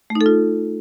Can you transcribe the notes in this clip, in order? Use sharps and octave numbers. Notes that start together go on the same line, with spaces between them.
A3
D#4
A4
F4